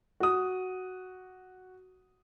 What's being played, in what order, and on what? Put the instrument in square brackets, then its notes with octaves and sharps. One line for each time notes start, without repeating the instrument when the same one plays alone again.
[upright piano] F#4 D#6